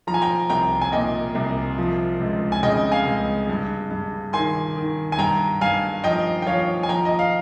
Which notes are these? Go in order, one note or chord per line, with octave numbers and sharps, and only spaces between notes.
F3 A#5
G#5
G5 A#5
C2 G5 A#5
G#5
A#2 D#5 G5
C2
F3
C#2
G#5
C#3 D#5 G5
F5 G#5
C#2
G2
G2
D#3 G#5 C6
D#3
G#5
G2 G5 A#5
G2 F5 G#5
F3 D#5 G5
G5
F3 C#5 F5
G#5
F3 G5 A#5
D#5
F5